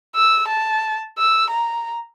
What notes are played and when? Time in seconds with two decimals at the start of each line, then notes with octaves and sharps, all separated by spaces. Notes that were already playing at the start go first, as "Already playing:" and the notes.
0.16 E6
0.48 A5
1.18 E6
1.50 A#5